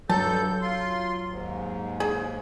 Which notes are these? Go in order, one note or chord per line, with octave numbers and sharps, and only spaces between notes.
G2 F#3 A4 A5 G6
F4 C6
D#2 G#2
G#4